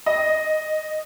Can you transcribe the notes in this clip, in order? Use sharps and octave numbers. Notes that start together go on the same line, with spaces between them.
D#5